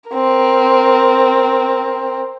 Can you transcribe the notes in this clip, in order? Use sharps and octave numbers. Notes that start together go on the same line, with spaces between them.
C4 A#4